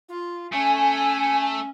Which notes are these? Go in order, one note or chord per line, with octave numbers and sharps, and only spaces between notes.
F4
A3 C#4 G#5